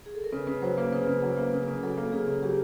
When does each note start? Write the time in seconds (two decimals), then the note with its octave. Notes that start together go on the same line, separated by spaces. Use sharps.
0.06 G#4
0.15 A4
0.24 A#4
0.32 C#3 B4
0.47 C#3 B4
0.62 F#3 C5
0.77 A#3 B4
0.92 C#3 B4
1.07 C#3
1.22 F#3
1.37 A#3
1.52 C#3 A#4
1.68 C#3
1.83 F#3 A4
1.98 A#3
2.12 C#3 G#4
2.28 C#3
2.42 F#3 G4